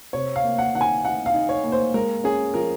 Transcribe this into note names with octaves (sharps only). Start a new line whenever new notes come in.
C3 C#5
F5
A#3
F#5
D#3 F#5
G#5
D#4 F#5
F5
D#4
C#5
A#3
C5
G#3 A#4
C#4 G#4
F3 A#4